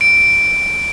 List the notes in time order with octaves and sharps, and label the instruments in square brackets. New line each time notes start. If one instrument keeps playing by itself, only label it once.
[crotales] D7